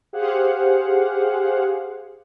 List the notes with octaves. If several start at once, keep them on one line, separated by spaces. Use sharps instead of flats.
G4 G#4 C5 F5 F#5